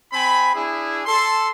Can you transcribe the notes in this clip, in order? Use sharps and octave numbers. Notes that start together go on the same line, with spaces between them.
C4 G#5 B5
D4 E4 G#4
A4 C6